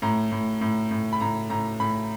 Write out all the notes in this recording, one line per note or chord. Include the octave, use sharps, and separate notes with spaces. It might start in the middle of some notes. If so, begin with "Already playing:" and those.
A2 A#5
A2
A2
A2
B5
A2 A#5
A2 A#5
A2 B5